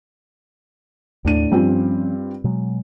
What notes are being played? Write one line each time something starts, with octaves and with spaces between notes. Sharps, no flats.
D#2 A2 D4 D#7
G2 F3 C4 C#4 F4
B2 F#3 G#3